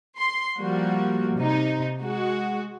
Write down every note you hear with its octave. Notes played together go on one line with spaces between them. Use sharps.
C6
F3 G3 A#3 F#4
C3 D#4
G#3 F#4